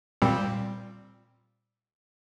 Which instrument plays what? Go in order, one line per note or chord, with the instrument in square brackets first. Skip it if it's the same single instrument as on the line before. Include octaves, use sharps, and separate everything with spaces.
[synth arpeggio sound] A#2 G3 C4